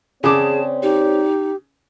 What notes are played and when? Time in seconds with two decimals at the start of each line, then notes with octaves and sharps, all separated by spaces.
0.24 C#3 C4 G#4 C#5 D5 A5 D6
0.83 D#4 G4